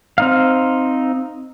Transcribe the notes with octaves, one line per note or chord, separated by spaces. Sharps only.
C4 D#4 F5